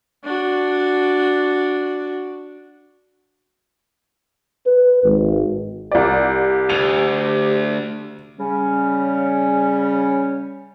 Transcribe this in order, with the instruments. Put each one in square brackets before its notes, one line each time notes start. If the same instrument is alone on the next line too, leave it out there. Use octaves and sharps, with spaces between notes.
[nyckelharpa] D4 F#4
[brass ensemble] B4
G#1
[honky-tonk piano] C2 D5 [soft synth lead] G4
[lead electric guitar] D2 [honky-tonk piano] F7
[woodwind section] C#3 G3 C#4